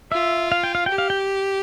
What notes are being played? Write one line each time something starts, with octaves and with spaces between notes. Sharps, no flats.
F4 E5
F5
G5
F5
G4 G5
F5
G5